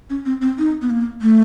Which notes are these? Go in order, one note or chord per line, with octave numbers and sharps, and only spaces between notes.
C#4
C4
C4
D#4
B3
A#3
A3